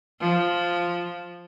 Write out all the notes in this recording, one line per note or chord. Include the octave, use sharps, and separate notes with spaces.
F3